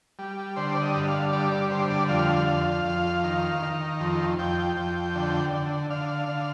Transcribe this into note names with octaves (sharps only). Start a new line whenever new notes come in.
G3
D3 C5
D5
D#5
G2
F5
G3 D5
D5
D3 C5
D5
F2 F5
F2
F2
D#3
D#3
F2
F2 G5
F2
D3
D3
D3 F5
D3